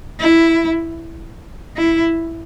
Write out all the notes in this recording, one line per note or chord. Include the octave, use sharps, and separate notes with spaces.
E4
E4